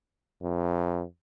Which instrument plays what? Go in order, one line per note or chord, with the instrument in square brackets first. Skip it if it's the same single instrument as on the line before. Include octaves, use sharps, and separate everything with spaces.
[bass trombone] F2